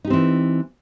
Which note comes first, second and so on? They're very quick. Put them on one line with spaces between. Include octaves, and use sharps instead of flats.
D#4 G4 C4 E3